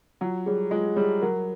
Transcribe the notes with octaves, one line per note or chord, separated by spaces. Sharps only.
F#3 F4
G3 G#4 C#5
G#3 F4
G3 G#4 C#5
F#3 A#4